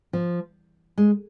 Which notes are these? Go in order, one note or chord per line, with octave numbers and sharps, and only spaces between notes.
F3
G#3